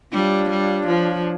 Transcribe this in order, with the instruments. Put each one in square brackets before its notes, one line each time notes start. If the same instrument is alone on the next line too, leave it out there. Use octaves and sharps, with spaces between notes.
[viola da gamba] G3 [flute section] D4 F4 C#5
[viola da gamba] G3
F3